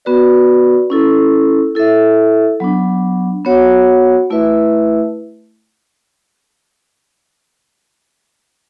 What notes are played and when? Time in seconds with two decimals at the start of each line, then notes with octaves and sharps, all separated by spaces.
0.05 B3 F#4 B4 D5
0.90 C#4 E4 A4
1.75 E4 A4 E5
2.60 F#3 B3 D4
3.45 B3 F#4 C#5 F#5
4.30 A3 E4 B4 E5